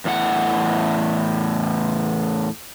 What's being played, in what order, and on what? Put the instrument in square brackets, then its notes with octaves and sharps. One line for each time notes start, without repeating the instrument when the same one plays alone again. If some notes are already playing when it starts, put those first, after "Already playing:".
[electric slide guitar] E2 A2 F#5